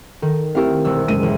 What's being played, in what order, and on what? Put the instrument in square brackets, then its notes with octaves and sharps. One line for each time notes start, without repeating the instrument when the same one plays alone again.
[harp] D#3 [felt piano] A4
[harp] A3 A#4 F5 [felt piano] C4 E4 G4
[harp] E1 C2 E6
[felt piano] F#1 G#3 D#7
[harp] A1